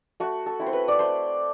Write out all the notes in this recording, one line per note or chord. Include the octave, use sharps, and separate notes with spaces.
A3 F#4
A4
C4 E4
C5
B4
D5
A3 C5